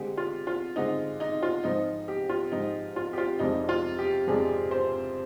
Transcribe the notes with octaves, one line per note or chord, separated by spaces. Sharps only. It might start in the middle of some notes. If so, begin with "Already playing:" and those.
Already playing: D3 G#3 C4 G4
F4
F4
D3 G#3 C4 D#4
D#4
F4
G#2 F3 C4 D#4
G4
F4
G#2 F3 C4 D#4
F4
G4
F4
F2 C3 F3 G#3 D4 D#4
F4
G4
F2 C3 F3 G#3 D4 G#4
C5